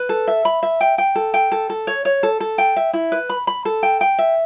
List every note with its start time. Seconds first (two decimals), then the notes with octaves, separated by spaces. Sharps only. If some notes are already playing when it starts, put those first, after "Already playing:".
Already playing: B4
0.09 A4
0.28 E5
0.45 B5
0.63 E5
0.81 G5
0.98 G5
1.16 A4
1.34 G5
1.52 A4
1.70 A4
1.87 C#5
2.05 C#5
2.23 A4
2.40 A4
2.58 G5
2.76 E5
2.93 E4
3.12 B4
3.29 B5
3.47 B5
3.65 A4
3.83 G5
4.01 G5
4.19 E5